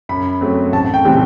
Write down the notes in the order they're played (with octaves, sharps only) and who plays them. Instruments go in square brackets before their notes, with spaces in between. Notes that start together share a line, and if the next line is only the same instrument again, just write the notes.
[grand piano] F#2 B5
F#3 A3 C4
A1 A5
G5
A2 E3 G3 C4